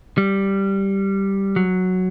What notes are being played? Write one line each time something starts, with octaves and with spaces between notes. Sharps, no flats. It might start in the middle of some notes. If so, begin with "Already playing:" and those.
G3
F#3